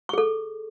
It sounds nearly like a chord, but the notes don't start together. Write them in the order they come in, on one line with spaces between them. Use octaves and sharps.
C#6 G#4 A4